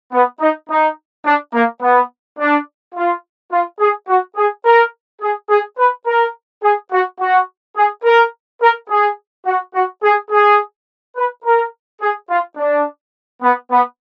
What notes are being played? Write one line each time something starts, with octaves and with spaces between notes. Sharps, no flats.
B3
D#4
D#4
D4
A#3
B3
D4
F4
F4
G#4
F#4
G#4
A#4
G#4
G#4
B4
A#4
G#4
F#4
F#4
G#4
A#4
A#4
G#4
F#4
F#4
G#4
G#4
B4
A#4
G#4
F4
D4
B3
B3